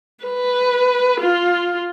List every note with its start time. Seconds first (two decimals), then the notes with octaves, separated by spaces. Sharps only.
0.24 B4
1.20 F4